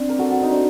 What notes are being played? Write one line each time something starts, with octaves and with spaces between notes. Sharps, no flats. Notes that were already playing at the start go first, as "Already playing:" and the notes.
Already playing: C4 D4
A#4
F#4 A4
F#4 A4
D#4
D4